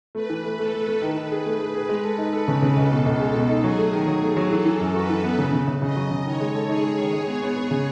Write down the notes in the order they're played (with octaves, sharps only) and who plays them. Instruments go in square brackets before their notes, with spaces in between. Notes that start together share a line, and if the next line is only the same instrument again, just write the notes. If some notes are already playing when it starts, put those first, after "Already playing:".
[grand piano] A3 [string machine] B4
[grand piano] E3
A3
[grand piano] A3 [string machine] A4
[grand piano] A3
A3
[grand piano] D#3 [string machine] B4
[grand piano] D#3
G#4
A3
G#4
G#4
G#3
A4
D#4
[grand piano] A4 [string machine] B4
[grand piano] C#3
C#3
[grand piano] C#2 [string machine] A4
[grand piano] B2
C#2
G#3
B2
D#4
[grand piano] F#3 [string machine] G#4
[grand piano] A3
D#3
[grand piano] F#3 [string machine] G#4
[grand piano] A3
F#3
[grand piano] E3 [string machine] A4
[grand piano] E3
F#2
[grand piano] F#4 [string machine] B4
[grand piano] E3
B3
C#3
C#3
C#3
[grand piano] C#3 [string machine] D#5
[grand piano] F#3
C#3
[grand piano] D#3 [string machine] C#5
[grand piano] G#3
A4
[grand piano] D#4 [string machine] G#4
[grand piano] G#3
D#3
G#3
B3
B3
B3
C#3